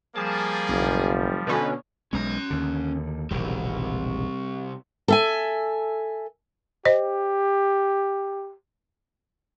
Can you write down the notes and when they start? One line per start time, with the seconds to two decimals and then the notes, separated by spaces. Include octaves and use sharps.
0.16 F3 G3 A#3 G#4 A5
0.69 F#1 B1
1.47 B2 D3 C4 C#4 D#4 B4
2.13 B1 G#3 C#4 A#5
2.50 D#2 D3
3.31 E1 A#1 C3 D#3 G3
5.08 A4 E5 G#5
6.85 G4 C5 D#5